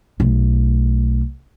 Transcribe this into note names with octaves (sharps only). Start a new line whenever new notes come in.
B1 A3